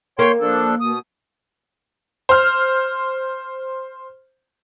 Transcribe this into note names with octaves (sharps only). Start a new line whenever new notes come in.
A#3 C#5 G5 C6
F3 D4 A4
B2 D#6
C5 F6